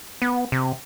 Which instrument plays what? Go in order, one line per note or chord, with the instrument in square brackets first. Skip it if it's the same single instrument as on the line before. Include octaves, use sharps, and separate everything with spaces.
[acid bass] B3
C3